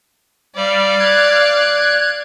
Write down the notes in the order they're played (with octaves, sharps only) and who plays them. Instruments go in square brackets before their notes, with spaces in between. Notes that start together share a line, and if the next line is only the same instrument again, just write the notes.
[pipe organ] G3 [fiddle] D5 F5
[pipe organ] F#6 G#6